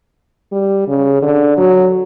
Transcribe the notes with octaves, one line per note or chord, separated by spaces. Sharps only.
G3
C#3
D3
F#3